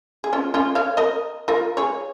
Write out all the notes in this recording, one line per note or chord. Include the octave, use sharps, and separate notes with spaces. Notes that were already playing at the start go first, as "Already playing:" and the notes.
G#4
C#4 F4
C#4 F4
C#5 F5
A#4 D#5
F4 A#4
G#4 C#5